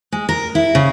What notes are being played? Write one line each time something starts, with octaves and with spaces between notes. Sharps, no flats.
G#3
A#4
E4
C#3